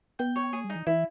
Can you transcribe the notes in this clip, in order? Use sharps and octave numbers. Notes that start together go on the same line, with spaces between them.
B3 G5
C#5
A#3 G#4
G3
D#4
E3
E3 E4